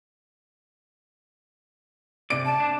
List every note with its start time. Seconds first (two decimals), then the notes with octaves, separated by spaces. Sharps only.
2.30 C3 D5 D7
2.45 A5
2.60 D4